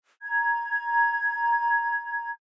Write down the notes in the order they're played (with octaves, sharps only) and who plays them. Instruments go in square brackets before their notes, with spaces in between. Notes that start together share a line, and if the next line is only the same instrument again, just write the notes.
[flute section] A#5 G#6